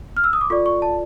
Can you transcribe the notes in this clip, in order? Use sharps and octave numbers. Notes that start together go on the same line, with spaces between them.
F6
E6
D#6
D6
F4 A4 D5 C#6
C#6
A5